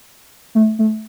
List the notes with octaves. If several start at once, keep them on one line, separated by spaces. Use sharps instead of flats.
A3
A3